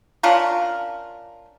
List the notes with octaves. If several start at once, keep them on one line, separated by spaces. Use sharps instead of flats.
C#4 D4 F4 A#4